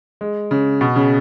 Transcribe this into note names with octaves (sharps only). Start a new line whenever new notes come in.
G#3
C#3
B2
C#3